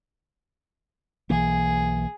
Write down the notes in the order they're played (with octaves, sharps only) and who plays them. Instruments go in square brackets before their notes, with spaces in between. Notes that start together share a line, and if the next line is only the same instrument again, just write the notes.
[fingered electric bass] B1 E3 A#3 [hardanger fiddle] G#4